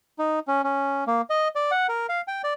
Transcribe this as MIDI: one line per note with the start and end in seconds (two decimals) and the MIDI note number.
0.19 0.39 63
0.48 0.62 61
0.64 1.04 61
1.07 1.21 58
1.30 1.48 75
1.56 1.71 74
1.71 1.87 78
1.89 2.07 70
2.09 2.22 77
2.28 2.42 79
2.44 2.54 74